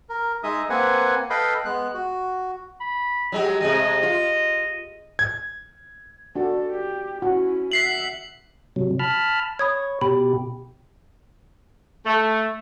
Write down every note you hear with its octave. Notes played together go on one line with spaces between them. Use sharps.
A#4
G#3 D#4 G#4 D#5 E5 D#6
A#3 C4 B4 F#5 G#5
A4 B4 D#5 F5 G5 B5
G#3 B3 F#6
F#4
B5
F#3 G#3 G4
C3 G#3 A3 D#5
F4
G#6
D4 F#4 A4
G4
C#4 E4 F#4
E5 F#5 B6 C7 F#7
C3 F#3
A5 B5 F6
C#5 B5 D#6 G#6
B2 G4 B5
A3